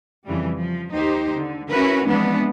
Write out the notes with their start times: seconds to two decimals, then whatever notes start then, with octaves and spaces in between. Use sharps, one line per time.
0.25 F2 C#3 E3 F3 G3
0.56 F3
0.90 D#2 D#4 G4 C5
1.35 D3
1.70 C#4 E4 F#4 A#4 B4
2.07 E3 F3 G#3 B3 C4 D4